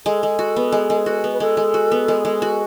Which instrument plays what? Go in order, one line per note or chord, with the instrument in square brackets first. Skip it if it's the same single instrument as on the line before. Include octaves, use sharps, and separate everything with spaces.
[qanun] G#3 [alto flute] A4
[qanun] G#3
F#4
B3
G#3
G#3
F#4
B3
[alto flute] B4
[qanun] G#3 [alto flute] A4
[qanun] G#3
F#4
B3
G#3
G#3
F#4